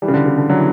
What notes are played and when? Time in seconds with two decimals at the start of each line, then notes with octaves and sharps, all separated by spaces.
0.02 E3 G3
0.08 C#3
0.14 D3
0.26 C#3
0.37 D3
0.50 D3 F#3
0.57 E3